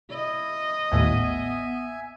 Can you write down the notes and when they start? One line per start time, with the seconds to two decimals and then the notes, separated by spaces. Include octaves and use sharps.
0.11 E4 D#5
0.91 A1 D#2 A2 B3 E5 G#5